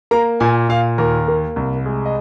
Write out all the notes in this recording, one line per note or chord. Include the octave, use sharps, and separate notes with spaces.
A#3 A#5
A#2 G#5
A#2 F5
D#2 A#4
A#3
C2
G#3
D#5